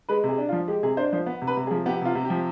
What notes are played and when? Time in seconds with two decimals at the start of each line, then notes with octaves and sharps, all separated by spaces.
0.09 G#3 B4
0.24 C3
0.29 G#4
0.38 D4
0.49 F4
0.52 F3
0.68 G#3 G4
0.83 C3 G#4
0.97 D4 C5
1.12 F3 C5
1.26 B3
1.42 C3
1.47 B4
1.57 C3
1.67 G#4
1.71 F3
1.86 B3 G4
2.02 C3 F4
2.15 C3
2.25 F3 G4